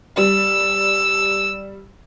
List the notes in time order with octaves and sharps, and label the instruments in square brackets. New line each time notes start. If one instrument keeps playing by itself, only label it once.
[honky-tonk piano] G3 [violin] E6